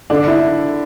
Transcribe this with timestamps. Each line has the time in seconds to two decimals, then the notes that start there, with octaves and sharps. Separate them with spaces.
0.10 D3 D4
0.27 E4